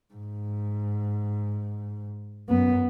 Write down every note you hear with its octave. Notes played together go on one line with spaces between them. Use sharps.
G#2
F#2 B3